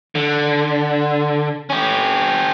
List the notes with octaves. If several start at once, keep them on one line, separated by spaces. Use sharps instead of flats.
D3
C#4 G4